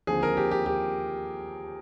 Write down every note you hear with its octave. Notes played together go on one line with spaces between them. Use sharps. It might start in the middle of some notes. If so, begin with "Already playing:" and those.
D#2 D3 F3 C4 G#4
A#4
G4
G4
G4